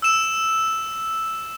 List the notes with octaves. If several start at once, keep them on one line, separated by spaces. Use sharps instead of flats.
E6 E7